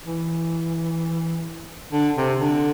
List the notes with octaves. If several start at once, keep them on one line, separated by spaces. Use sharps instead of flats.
E3
D3
C3
D3